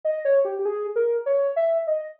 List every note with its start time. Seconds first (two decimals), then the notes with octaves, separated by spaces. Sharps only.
0.05 D#5
0.25 C#5
0.45 G4
0.59 G4
0.65 G#4
0.96 A#4
1.26 C#5
1.56 E5
1.87 D#5